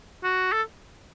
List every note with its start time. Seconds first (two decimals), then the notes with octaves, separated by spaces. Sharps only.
0.24 F#4
0.52 A4